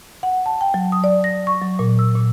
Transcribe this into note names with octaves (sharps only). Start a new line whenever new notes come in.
F#5
A5
G5
F#3
D#6
D5
A#6
C#6
F#3
A#2
E6
A#2